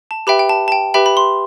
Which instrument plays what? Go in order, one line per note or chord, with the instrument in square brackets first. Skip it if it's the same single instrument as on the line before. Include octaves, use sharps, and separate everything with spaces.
[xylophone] A5
G4 B4 E5 G5 B5
G5
A5
A5
G5
G4 B4 E5 G5 B5
B5
C6